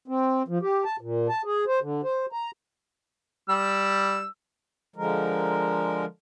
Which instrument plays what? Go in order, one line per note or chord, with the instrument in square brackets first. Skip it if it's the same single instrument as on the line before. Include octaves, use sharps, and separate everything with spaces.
[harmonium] C4
F3
G4
A5
A#2
A5
G#4
C5
D3
C5
A#5
[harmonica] G3 E6
[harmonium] D3 F3 G#3 A#4